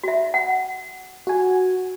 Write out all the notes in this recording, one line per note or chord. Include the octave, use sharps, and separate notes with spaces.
F#4 E5
F#5
F#4 G#5